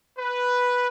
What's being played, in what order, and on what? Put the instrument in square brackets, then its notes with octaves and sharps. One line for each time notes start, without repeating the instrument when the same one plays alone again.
[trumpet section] B4